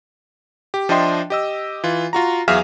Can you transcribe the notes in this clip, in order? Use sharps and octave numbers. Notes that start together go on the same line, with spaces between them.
G4
F3 D4 D#5 E5 G5 C6
G4 D#5 E6
E3 F4
F4 F#4 A#5
E2 F#3 G#4 E5 F5 F6